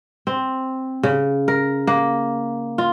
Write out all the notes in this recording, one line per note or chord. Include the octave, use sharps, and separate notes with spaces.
C4
C#3
A#4
A#3
F4